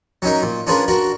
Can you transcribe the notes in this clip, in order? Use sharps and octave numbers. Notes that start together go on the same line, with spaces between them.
F#3 C#4 D#4 A#4
A#2
C#4 D4 F4 G#4 A#4 B4
D4 F#4 A#4